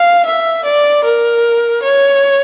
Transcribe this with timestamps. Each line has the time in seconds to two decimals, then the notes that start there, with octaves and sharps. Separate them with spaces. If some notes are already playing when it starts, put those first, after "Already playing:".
Already playing: F5
0.25 E5
0.65 D5
1.04 A#4
1.82 C#5